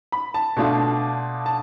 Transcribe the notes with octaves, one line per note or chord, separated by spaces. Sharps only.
B5
A5
B2 A3 D4 F4
A5